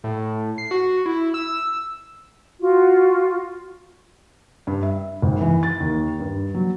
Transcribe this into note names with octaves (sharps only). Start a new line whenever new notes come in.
A2
C7
F#4
E4
E6
F4 F#4
G2
E5
G#1
E3
A6
D#2
G2
F#3